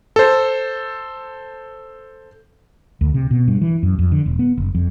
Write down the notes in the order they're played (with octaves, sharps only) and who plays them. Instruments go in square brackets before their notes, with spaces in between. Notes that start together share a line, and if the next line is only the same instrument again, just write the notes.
[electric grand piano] A4 C5
[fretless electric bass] D2
C3
B2
G2
E3
F#2
F2
D3
E1
B3
F#1
F2